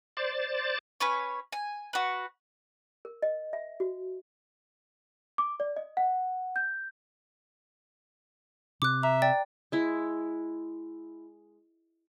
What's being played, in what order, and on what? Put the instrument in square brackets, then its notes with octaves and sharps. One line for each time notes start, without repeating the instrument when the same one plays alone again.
[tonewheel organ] C5 D5 A6
[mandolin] C#4 B4 C#5
G#5
F#4 B4
[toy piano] A#4
D#5
E5
F#4
[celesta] D6
D5
D#5
F#5
G6
[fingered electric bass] C3 [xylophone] D6 F#6
[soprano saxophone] E5 [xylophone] A#5
[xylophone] D5 G5 A6
[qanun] G#3 E4